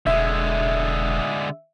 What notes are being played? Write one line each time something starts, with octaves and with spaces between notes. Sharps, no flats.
E1 D3 G#3 E5